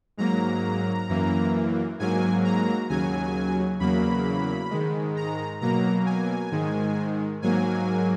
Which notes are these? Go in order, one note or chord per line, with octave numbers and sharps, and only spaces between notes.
G#2 F#3 A#3 A#5
F#2 E3 A#3
G#2 F#3 A#3 G#5
A#5
D#2 C#3 F#3 G#5
E2 C#3 F#3 A#3 B5
G#2 D#3 G#3
A#5
B2 F#3 A#3 A#5
G#5
G#2 D#3 G#3
G#2 F#3 A#3 G#5